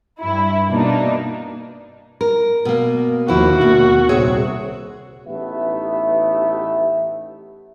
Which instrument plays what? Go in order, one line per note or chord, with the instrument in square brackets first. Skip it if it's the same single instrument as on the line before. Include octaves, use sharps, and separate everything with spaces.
[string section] G2 E4
B2 A#3 D4 D#4
[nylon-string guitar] A#4
B2 A#3
[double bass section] D#2 D3 A#3 [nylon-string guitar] F3 E4 [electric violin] F#4
[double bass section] D#2 [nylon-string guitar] B2
[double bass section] C2 A#2 C4 [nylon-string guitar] G#4 C#5 E5
[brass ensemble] A1 A3 B3 D#4 G4 E5